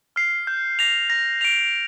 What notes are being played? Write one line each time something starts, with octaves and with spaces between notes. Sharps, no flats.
F6 C7
G6
A#6 F7
A#6
D7 F7